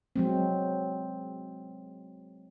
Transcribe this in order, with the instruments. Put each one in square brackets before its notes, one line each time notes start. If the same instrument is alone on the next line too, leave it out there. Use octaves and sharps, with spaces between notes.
[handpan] F#3 G#3 C4